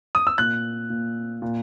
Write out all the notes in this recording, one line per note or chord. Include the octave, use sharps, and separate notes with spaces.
D#6
E6
A#2 F#6
A#2
A#2